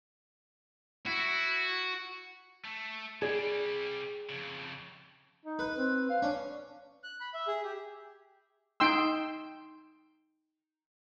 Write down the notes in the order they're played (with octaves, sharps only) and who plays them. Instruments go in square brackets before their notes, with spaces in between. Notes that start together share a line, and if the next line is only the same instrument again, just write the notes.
[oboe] E4 [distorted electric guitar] F#4
[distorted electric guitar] A3
[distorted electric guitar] C3 G3 [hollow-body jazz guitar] G#4 D5
[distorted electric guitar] F2 C#3
[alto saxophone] D#4
[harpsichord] B4
[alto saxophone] C4
F5
[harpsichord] C#4 [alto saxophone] D4
[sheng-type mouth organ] F#6
B5
E5
G#4
G4
[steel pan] D#4 G5 C6 E6